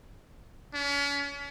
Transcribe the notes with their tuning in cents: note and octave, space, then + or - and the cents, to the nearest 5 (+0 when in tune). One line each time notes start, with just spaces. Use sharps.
C#4 +40